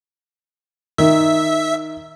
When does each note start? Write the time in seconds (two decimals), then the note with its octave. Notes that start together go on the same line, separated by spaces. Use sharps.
0.98 D#3 E5